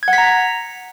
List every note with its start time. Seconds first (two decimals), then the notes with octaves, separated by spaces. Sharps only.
0.03 G#6
0.08 F#5
0.13 B6
0.18 A#5